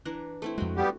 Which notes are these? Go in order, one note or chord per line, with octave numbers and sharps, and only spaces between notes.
E3 D4 A#5
A3 C4 E4
F2 G#3 F#4 G5
G3 B3 G4